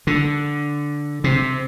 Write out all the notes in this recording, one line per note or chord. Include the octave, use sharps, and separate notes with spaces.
D3
C3